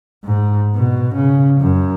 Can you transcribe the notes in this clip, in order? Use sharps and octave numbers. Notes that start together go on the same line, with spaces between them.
G#2
B2
C#3
F#2